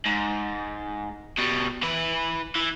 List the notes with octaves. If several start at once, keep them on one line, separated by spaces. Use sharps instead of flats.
G#2
B2 G3
E3 B4
E3